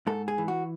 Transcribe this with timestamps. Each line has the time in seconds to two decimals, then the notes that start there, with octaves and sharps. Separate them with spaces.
0.07 G#2 A4
0.28 G#4
0.38 E3
0.48 F#4